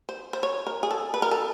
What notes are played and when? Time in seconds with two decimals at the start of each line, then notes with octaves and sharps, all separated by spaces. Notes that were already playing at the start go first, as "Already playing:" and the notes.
0.09 C5
0.33 C5
0.43 C#5
0.67 A#4
0.83 G#4
0.91 A4
1.14 B4
1.22 A#4
1.31 A4